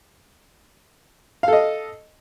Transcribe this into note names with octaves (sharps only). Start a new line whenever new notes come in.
A4 D#5 F5